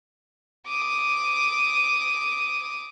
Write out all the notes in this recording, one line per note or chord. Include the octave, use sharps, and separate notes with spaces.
D6 D#6